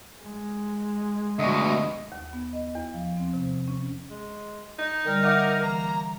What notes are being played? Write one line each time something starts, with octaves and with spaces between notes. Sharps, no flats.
G#3
D2 B2 D#5
D#2
B3
D#5
E2
F3
C4
C3
C#4
G#3
D#4
D3 G3 A#4
D#4 E5 F#5 D6
E3 A#3 A#5